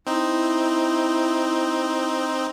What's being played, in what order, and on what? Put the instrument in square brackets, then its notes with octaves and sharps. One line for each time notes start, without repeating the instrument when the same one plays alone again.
[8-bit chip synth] C4 D#4 [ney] E4